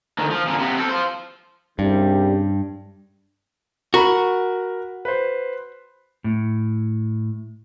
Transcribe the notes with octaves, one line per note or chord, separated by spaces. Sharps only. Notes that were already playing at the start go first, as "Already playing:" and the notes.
D2 D#3
F3
A#2 D3
C3 B3
C4 A4
F4 C5
C2 G2 C#3 G3
F#4 A#4 A#5 B5
B4 C5
A2